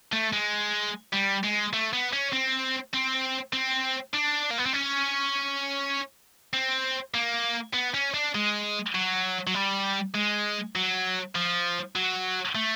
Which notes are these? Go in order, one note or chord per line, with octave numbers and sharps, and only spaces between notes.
A3
G#3
G3
G#3
A3
B3
C#4
C4
C4
C4
D4
A#3
B3
C4
C#4
C4
A#3
B3
C#4
D4
G#3
F#3
F#3
G3
G#3
F#3
F3
F#3
A3